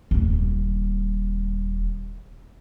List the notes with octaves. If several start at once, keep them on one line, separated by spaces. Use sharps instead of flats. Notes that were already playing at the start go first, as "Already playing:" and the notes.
D#1 G3